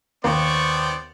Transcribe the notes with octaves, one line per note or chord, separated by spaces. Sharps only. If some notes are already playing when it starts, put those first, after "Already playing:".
D#2 A#3 B3 C5 D5 C#6